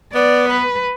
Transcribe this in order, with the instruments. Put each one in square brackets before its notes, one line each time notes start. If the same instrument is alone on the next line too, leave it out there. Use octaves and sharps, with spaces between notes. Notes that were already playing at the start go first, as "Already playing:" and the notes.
[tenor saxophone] B3 [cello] D5
[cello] B4